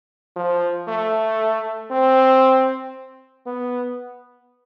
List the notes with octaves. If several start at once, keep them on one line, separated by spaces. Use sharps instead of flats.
F3
A3
C4
B3